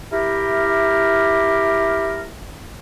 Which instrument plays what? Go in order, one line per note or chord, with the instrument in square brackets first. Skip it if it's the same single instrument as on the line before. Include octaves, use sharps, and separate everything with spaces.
[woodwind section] E4 G4 A#4